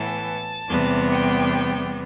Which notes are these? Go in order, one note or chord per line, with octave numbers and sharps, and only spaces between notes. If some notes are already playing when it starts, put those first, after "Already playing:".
Already playing: A2 E3 B3 A5
E2 C3 G3 B3
G5